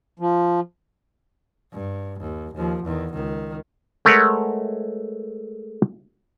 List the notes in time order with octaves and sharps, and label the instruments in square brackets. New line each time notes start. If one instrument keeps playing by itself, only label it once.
[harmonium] F3
[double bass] G2
D#2
D#2 F3
E2 D#3
C#2 D#3
[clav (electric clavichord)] G#3 A3 A#4 B4 C#5 F#5